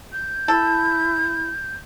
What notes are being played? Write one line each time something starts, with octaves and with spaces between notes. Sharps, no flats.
G6
E4 A4